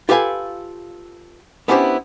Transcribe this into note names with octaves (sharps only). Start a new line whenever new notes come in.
F4 G4 A4 B4 F5 G#5
B3 C#4 D4 E4 G4 C5